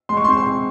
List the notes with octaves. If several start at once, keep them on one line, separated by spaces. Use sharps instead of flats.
G#3 C6
C#6
C6
C4
C6
C4